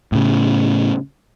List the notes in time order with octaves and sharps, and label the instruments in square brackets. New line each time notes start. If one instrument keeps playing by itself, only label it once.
[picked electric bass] A2 C#3